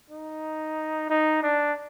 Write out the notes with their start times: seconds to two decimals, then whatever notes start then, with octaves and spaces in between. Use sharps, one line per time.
0.10 D#4
1.10 D#4
1.43 D4